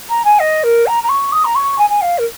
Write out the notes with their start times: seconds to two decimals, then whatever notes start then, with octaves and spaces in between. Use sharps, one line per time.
0.09 A#5
0.24 G#5
0.39 D#5
0.63 A#4
0.86 A#5
1.03 A#5
1.09 C#6
1.32 D#6
1.44 A#5
1.55 C#6
1.78 G#5
1.89 G#5
2.01 F5
2.18 A#4